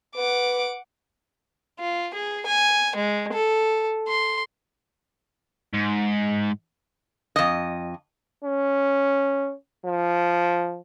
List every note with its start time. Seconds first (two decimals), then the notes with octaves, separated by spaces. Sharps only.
0.16 B4 F#5 D6
1.79 F4
2.14 G#4
2.46 G#5
2.96 G#3
3.33 A4
4.08 C6
5.74 G#2
7.36 F2 D#5
8.45 C#4
9.86 F3